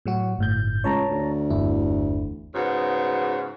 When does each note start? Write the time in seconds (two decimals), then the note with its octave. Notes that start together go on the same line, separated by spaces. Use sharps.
0.06 A2 F#3 F#4
0.38 G1 A2 G6
0.84 C#2 C#5 A5 A#5
1.10 D2
1.50 G1 E2 E4
2.54 G#2 C#3 B3 F#4